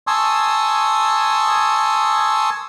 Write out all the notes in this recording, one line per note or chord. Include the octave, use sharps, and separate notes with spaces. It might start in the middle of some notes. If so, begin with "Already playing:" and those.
G#5 A5 C6 C#6 D#6 E6